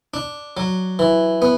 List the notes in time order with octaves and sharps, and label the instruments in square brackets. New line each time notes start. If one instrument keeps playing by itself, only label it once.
[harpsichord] D4
F#3
E3
B3